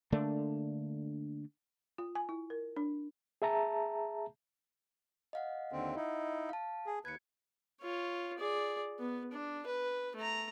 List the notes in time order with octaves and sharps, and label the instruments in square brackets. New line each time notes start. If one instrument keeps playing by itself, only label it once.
[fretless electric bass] D3 A3 A#3 D4
[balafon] F4
G#5
E4
A#4
D4
[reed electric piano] G#4 E5 A5 A#5
[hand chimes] D#5 F5 F#5
[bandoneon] D#2 D3 C4
D#4 E4
[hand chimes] F5 A5
[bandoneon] G#4
[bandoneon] D#2 B4 [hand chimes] G#6 C#7
[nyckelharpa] F4 C#5
G#4 D5
B3
D4
B4
A3 A#5